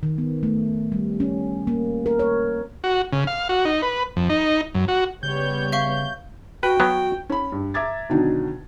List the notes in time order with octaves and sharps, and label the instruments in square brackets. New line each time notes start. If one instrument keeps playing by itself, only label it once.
[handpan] D#3
B3
A3
G3
C#4
A#3
A#4
C#5
[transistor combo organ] F#4
C#3
F5
F#4
D#4
B4
F2
D#4
F#2
F#4
[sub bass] C#3 [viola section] G3 B3 C#5 [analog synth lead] G6
[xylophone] E5 F5 C#6
[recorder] F#4 [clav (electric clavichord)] B4 [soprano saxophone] G5
[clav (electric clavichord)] F#3 B3
[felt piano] C#4 B5
G2
E5 A#5 D6 G#6 A6
B2 D3 D#3 F#3 D4 D#4